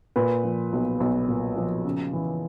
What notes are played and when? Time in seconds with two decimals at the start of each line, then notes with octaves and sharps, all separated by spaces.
0.16 A#2 B4
0.44 F3
0.73 B1
1.00 B1
1.28 A#2
1.56 F3
1.85 C#3
2.13 E3